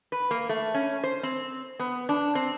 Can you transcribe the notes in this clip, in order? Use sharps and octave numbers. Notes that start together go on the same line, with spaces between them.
B4
A#3
A3
C#4
C5
C4
B3
D4
C4